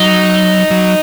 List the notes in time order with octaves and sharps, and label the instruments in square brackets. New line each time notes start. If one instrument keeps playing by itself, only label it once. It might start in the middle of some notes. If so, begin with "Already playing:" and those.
Already playing: [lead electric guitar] F#3 [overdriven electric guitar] D#4
[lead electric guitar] F#3